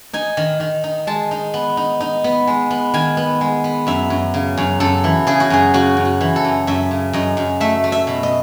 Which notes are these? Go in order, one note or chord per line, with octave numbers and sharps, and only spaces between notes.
D#4 G#5
D#3
D#3
D#4
G#3 A5
D#4
B3
D#4
D#4
B3
G#3
B3
D#3 G#5
B3
G#3
B3
F#2 E5
F#2
C#3
F#2
F#2 A4
E3
C#3 G#4
F#4
F#2 G#4
C#3 F#4
F#2
F#4
E3
A4
F#2
F#2 E5
C#3
F#2 D#5
F#2
A3 E5
A3
E5
B2
D#5